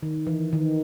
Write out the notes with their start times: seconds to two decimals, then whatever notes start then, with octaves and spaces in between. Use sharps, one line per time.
0.02 D#3
0.27 E3
0.53 D#3